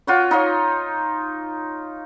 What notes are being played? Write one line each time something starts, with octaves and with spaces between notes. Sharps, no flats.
F4 F#4 C#5
D#4 F4 C#5